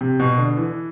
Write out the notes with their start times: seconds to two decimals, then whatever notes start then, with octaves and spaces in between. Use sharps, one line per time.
0.01 C3
0.20 B2
0.38 D3
0.57 E3